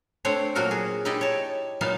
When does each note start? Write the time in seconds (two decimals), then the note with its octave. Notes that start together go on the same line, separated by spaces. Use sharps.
0.25 A3 C4 D4 C5 C#5
0.55 A#2 F#3 A#3 F#4 A4 A#4
0.71 G#4
1.05 D#4 E4 G4 D5 D#5
1.21 C#5 A5
1.81 A#2 F#3 B3 D#4 F5 A5